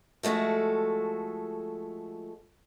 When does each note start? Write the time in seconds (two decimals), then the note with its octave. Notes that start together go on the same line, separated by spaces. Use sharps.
0.23 F3 G#3 A3 F#4 A4